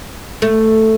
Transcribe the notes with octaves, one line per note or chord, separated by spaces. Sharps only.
A3